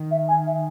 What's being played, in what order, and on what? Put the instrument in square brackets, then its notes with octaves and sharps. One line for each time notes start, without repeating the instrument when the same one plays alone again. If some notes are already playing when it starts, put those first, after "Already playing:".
Already playing: [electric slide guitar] D#3
[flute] E5
G#5
E5